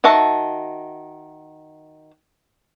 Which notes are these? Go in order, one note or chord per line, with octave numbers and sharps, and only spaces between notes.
D#3 F#4 E5 A5